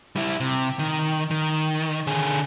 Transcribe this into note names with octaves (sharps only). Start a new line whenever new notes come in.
G3 E4
C3
D#3
D#3
D3 G#4